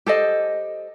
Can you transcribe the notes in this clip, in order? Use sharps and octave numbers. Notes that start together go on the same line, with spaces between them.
G4 A4 C5 D#5